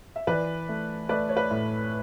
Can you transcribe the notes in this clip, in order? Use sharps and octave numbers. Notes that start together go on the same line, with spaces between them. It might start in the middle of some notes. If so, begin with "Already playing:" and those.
E5
E3 B4 D5
A3
A3 B4 D5
C#5
B4 D5
A2